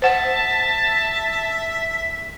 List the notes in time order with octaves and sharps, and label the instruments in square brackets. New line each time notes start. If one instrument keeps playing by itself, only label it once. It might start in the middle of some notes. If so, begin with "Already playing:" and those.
[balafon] C5 F#5 [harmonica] E5 [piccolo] A5